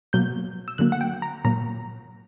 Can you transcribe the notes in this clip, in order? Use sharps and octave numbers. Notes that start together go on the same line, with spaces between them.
B2 F#3 A#3 G6
E6
D3 F#3 A#3 F#6
F#5
G5
A#5
A#2 F#3 A#3 A#5